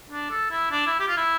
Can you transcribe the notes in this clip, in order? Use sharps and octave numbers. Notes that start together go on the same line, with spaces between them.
D4
A4
E4
D4
E4
G4
F4
E4